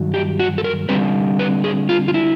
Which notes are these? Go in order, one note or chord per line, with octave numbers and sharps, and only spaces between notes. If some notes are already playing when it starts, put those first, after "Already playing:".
Already playing: G2 D#3 F#3
G4
F#4
A4
A#4
D3 G3 C4 B4
B4
G#4
F4
F4
E4